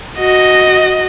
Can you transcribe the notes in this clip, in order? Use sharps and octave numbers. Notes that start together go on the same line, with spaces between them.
F#4 D#5